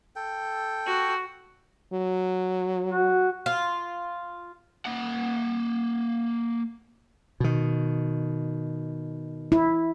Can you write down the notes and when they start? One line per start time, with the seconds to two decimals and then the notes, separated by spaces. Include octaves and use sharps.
0.16 A4 G5
0.86 F#4
1.93 F#3
2.89 F#4
3.46 F4
4.86 A#3 F#5
7.40 B2 D#3
9.52 E4